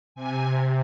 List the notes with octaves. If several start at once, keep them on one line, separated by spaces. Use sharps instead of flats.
C3 G#5